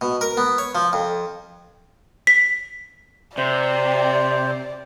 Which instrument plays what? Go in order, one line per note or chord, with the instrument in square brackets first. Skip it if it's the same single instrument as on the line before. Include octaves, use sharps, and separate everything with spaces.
[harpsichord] B2
A#4
B3
C#5
F3
F2
[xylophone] B6
[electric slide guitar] C3 [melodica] C5 [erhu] D5